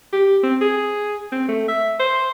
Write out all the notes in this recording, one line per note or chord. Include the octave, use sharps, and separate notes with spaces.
G4
C4
G#4
C4
A3
E5
C5